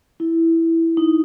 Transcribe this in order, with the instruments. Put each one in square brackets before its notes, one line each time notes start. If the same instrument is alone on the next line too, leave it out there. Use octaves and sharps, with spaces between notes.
[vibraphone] E4
D#4